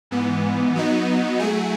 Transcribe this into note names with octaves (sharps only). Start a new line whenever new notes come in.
G#2 E3 B3
F#3 B3 D#4
F#3 A3 E4 G#4